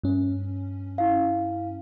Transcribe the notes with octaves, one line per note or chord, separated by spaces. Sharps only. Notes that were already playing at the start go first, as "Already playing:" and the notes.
G2 C#4
E4 F5